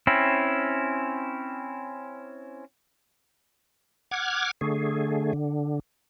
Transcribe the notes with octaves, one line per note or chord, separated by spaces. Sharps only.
C4 C#4 E4
F#5 D6 F6 G#6
D3 A3 G#4
D3